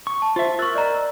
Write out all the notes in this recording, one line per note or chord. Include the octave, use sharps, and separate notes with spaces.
C#6
A5
F4 C5 E5
A#4 C#6 E6 F#6 A6
D5 D#5 A#5